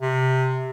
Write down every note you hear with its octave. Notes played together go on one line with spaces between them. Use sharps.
C3